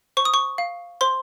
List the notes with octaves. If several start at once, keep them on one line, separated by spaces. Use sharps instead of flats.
C5 C#6
D#6
C#6
F5
C5 C6